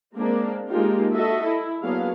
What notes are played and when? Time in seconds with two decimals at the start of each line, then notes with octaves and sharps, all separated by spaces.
0.16 G#3 A#3 C4 D4
0.69 G#3 A#3 D4 D#4 F4 G4
1.14 F#4 A4 D#5 E5
1.45 E4
1.83 F#3 A#3 B3 D4 G#4 F5